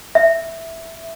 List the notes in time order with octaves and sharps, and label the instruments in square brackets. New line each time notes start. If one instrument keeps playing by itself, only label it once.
[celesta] E5